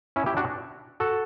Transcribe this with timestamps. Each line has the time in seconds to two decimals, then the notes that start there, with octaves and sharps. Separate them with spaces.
0.16 C#4 E4
0.26 E4 G4
0.37 D4 F#4
1.00 F#4 A4